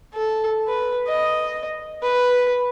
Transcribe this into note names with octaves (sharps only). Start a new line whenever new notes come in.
A4
B4
D#5
B4